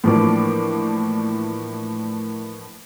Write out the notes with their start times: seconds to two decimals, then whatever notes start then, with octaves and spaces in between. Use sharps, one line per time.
0.04 A2 E3 F3 A#3 D4 D6